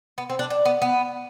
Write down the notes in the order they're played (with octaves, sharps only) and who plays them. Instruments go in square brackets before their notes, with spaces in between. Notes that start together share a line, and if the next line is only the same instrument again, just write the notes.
[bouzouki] B3
C4
D4
D4
B3
B3